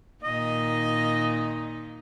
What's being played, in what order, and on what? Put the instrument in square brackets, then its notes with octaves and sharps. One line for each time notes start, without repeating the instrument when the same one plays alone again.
[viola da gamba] A#2 D#3 D#4 [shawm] D#5